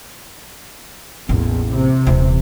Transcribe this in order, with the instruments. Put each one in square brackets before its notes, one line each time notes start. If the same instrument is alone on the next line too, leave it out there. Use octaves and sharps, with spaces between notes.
[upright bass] A1 A#3 [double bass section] E2
[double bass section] C3
[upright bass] D#1 E3